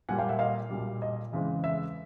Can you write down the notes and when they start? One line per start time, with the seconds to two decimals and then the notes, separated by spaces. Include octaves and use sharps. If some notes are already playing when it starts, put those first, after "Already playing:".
0.09 A#2 G3 A#3 F#5 G#5
0.19 F5 G5
0.29 E5 F#5
0.39 D#5 F5
0.71 B1 A#2 G3
1.02 D#5
1.33 E2 C#3 E3 G#3 C4
1.64 E5